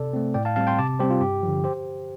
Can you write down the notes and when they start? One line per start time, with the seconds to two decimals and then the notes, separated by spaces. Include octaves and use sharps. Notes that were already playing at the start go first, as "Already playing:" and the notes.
Already playing: C3 A4 D5
0.13 A3 C4
0.34 A2 D5 G5
0.45 F5 A5
0.56 G3 C4 F5 A5
0.67 G5 C6
0.79 C3 A5 D6
0.99 G3 G4 C5
1.03 C4
1.10 F4
1.21 G2 G4
1.43 D3 F3
1.64 G4 C5